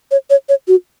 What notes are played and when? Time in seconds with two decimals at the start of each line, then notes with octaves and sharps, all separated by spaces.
0.11 C#5
0.30 C#5
0.49 C#5
0.68 F#4